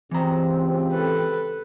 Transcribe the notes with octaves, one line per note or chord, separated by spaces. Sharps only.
C#2 E3 C4 G4 A#5
A4 B4